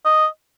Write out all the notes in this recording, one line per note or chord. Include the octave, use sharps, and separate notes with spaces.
D#5